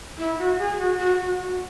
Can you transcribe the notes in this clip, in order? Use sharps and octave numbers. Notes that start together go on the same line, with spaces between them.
E4
F#4
G#4
F#4
F#4
F#4
F#4